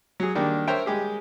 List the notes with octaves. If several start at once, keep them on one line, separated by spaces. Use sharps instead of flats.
F#3 G#4
D#3 G3 A#3 D4
A#4 C5 C#5 E5 G5
G3 G#3 G4 G#4